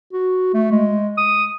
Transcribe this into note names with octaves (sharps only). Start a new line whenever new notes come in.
F#4
A3
G#3
D#6